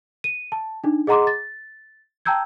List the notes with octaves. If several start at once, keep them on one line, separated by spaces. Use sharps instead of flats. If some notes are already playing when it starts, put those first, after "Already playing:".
D#7
A5
D4 D#4
G#4 D#5 F#5 A#5 C6 D6
A6
G5 A5 A#5 E6 G6 G#6